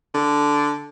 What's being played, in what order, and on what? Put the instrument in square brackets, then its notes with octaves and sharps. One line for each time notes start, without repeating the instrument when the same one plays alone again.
[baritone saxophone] D3